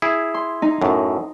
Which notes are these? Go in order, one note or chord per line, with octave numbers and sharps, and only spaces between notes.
E4 G#4
C6
D#4
F#2 A2